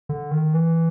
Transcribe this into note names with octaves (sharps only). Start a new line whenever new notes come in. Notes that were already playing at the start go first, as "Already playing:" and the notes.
D3
D#3
E3